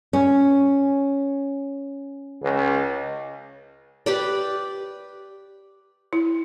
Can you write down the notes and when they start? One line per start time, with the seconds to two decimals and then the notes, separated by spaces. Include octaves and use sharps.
0.13 C#4
2.43 C#2
4.06 G4 B4 D5
6.13 E4